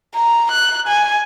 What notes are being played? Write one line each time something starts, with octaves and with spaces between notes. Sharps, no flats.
A#5
F#6
G#5